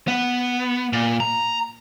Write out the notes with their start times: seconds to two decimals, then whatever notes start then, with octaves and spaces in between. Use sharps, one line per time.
0.08 B3
0.93 A#2
1.20 A#5